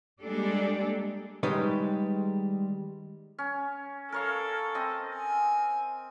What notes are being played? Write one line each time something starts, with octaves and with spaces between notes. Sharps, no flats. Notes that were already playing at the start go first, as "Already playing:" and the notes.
G3 G#3 A#3 D4 G4 A4
D#3 G3 G#3 D#4 B4 C#5
C#4
A4 A#4 C#5 F5
C4 D#5
G#5